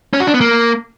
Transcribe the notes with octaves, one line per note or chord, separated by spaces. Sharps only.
C#4
F#4
D4
B3
A#3